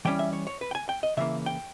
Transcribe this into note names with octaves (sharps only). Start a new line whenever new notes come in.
E3 G3 C#4 G5
E5
C#5
C#5
B4
G5
G#5
G5
D#5
C#3 E3 A#3 E5
G5